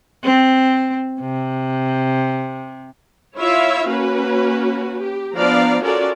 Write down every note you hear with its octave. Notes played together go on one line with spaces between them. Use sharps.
C4
C3
E4 F4 C#5 E5 F5
A#3 C#4 F#4 B4
G4
F3 B3 D4 D5 F5 A#5
C#4 F4 F#4 A4 A#4 D5